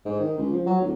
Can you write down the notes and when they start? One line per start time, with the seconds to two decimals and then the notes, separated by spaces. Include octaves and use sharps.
0.05 G#2
0.20 D#3
0.38 C#2
0.53 F3
0.66 F#3
0.81 D1